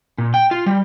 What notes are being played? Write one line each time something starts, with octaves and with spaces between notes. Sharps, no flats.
A#2
G5
F4
G3